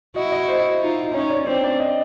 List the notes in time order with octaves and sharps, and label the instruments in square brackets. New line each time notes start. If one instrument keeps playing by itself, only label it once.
[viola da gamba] E4 F#4 [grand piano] D#5
[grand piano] D#5
C5
[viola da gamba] D#4 F4
[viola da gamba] C#4 D#4 [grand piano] C#5
[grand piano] D5
[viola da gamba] C4 D4 [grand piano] C5
[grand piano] D5
D#5